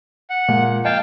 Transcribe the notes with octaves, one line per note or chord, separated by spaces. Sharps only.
F#5
A#2 F3 G#3
D#5 F5 G5 A5 G#6